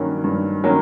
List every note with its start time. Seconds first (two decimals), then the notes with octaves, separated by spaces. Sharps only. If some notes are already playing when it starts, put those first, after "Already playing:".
Already playing: G2 D#3 F#3 A#3 C#4
0.24 G2
0.64 D#3 F#3 A#3 C#4